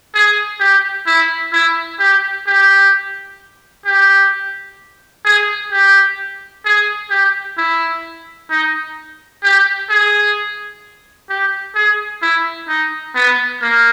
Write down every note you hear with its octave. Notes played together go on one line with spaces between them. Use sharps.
G#4
G4
E4
E4
G4
G4
G4
G#4
G4
G#4
G4
E4
D#4
G4
G#4
G4
G#4
E4
D#4
B3
A#3